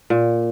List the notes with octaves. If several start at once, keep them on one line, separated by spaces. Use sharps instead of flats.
A#2